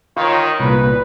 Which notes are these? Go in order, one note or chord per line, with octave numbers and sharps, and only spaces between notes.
D#3 F4 C#5
C2 A#2 B4